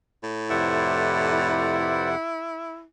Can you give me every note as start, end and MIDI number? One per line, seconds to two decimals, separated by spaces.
0.23 1.97 45
0.50 2.15 41
0.50 2.15 48
0.50 2.84 64
0.50 2.09 71
0.50 2.09 72
0.50 2.09 74
0.50 2.15 78